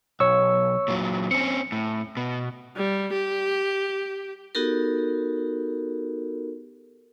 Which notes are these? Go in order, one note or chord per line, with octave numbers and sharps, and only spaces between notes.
B1 C#5 C#6 E6
A#2 F#3
C4 C#4 C#7
A2
B2
G3
G4
B3 D#4 F#4 G4 A4 A#4